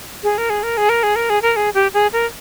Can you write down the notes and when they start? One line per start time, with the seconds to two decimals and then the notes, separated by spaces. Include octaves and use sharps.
0.23 G#4
0.38 A#4
0.50 G#4
0.63 A#4
0.77 G#4
0.89 A#4
1.03 G#4
1.16 A#4
1.30 G#4
1.42 A#4
1.56 G#4
1.74 G4
1.94 G#4
2.13 A#4